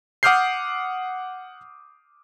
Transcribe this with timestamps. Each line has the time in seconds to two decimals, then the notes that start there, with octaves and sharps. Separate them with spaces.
0.23 F#5 D6 D#6 F6 G6 C7